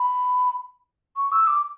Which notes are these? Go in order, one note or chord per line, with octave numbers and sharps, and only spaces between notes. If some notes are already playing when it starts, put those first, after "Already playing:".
Already playing: B5
C#6
E6
D6